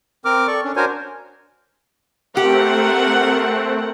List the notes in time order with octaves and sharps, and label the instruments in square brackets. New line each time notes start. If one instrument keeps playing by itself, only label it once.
[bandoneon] C4 A#4 D6 F6
A4 D5 C#6
C#4 D4
D4 F#4 A#4 C5 C#5 G#5
[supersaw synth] A3 C4 [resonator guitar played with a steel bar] G4 [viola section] A#4 F#5